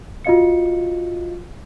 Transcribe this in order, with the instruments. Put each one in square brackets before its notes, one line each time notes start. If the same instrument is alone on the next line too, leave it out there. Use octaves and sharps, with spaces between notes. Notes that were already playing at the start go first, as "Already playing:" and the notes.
[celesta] F4 F#4 D#5 F5 C#7